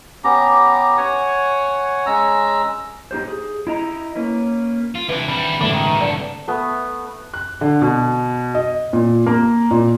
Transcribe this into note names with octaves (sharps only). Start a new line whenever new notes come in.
B3 C#4 G4 A#5
C#5 F#5 G#5
G#3 C#4 A#5 E6
D#4 G4 C5
G#4
E4 D#5 A#5
A#3 C#4 B4
F4
C3 E3 D4 E4
D#3 G3 C4
A2 D3 E3 G#3 D4 F4 D5
G2 C3 D#3
D3 C4 A4 D5
A3 B3
F#6
D3
B2
D#5
A#2
A#3
A#2